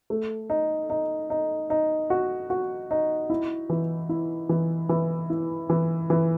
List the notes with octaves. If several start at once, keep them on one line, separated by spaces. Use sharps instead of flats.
A3
D#4
D#4
D#4
D#4
F#4
F#4
D#4
E4
E3
E4
E3
E3
E4
E3
E3